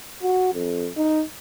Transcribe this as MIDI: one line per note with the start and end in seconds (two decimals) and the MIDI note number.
0.23 0.53 66
0.54 0.89 41
0.97 1.24 63